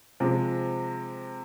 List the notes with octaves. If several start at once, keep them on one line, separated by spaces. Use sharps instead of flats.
C3 F3 G#3